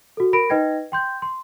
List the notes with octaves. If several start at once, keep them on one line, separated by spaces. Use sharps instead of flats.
F#4 A4
A#4 B5 A#6 D7
D#4 B4 D#5 G5 G#6 A#6
G5 C6 G6
C6